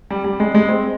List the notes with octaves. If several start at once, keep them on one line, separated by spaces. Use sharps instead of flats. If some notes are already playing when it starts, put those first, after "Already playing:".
G3
G3
G#3
G#3
C4